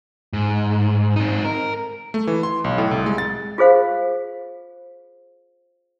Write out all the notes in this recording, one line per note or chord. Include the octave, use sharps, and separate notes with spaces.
G#2
C4 D#4
A#4
A3
E3
C6
B1
A2
C2
G#3
A6
F4 G#4 C5 F5